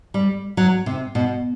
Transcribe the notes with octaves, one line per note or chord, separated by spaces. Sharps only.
G3
F#3
C3
B2